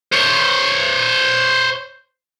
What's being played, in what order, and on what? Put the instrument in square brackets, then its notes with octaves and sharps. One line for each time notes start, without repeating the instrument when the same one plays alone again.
[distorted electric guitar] C5 C#5